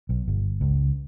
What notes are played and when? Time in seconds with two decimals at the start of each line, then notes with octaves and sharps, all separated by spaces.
0.09 B1
0.28 G1
0.61 C#2